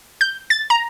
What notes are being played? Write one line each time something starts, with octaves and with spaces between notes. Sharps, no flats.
G6
A6
A#5